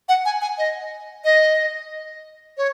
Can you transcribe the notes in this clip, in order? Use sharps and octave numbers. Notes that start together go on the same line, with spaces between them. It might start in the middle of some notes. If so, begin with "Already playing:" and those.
F#5
G#5
G#5
D#5
D#5
C#5